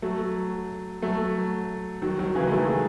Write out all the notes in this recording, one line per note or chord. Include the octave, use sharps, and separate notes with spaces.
F#3 A3
F#3 A3
D#3 F#3
D#3 F#3
C#3 E3
G#3
F#3 A3